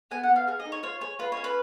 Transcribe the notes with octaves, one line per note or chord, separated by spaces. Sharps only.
B3 G#5
F#5
B3
F5
G#4 F5
D#5
D#4
C#5
F4 C#5
G#4 C#5
F4 B4
C#5
C#4
B4